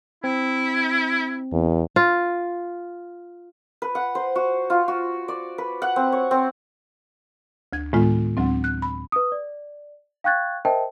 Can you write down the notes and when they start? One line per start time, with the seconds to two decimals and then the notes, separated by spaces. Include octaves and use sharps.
0.24 C4 E4
1.52 E2
1.96 F4
3.82 B4
3.95 F#5
4.15 C5
4.36 F#4
4.70 F4
4.88 F#4
5.28 D5
5.58 B4
5.82 F#5
5.96 C4
6.12 C#5
6.31 C4
7.73 D2 G#6
7.93 A2 D#3 G#3 B3 F4
8.37 D2 F#3 C4
8.64 F#6
8.82 B5
9.12 B4 D#6
9.32 D5
10.24 F5 G5 C#6 F#6 G#6 A6
10.65 A#4 C5 D#5 E5 G5 A5